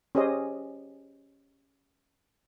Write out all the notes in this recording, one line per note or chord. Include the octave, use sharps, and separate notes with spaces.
C#4 G4 G#4 C5 D#5